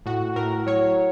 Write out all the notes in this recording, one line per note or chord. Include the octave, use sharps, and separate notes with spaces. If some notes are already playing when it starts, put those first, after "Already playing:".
A2 F#4
A2 A#4
F#3 C#5